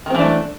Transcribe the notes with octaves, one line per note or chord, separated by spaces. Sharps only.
D#3 E3 A3 C4 D4